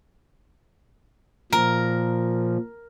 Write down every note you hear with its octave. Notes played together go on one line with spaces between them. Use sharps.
A#2 F3 A#4